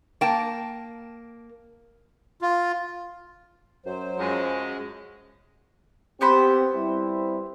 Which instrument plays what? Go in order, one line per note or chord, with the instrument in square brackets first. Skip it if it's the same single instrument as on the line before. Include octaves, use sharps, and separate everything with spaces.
[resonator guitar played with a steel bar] A#3 G5 A5
[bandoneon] F4
[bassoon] F#2 [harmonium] F#3 C5
[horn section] F#2 G#3 [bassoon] F3
[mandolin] B3 C5 B5 [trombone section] C4 G4
[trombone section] G3 C4 E4